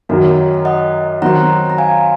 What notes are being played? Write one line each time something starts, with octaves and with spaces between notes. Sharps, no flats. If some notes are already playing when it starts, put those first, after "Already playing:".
F#2 D#3 F#3 F#4 A#4
D#5 F#5
D#3 F#3 C4 F#4 F#5 A#5
A#5
F5 G#5